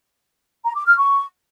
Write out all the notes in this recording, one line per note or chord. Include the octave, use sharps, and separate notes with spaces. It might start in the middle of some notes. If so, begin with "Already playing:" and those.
A#5
D6
F6
C#6